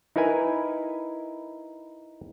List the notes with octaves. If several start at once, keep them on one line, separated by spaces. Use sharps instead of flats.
D#4 E4 A#4 B4 G#5